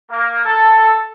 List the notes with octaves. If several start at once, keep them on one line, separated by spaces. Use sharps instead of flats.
A#3
A4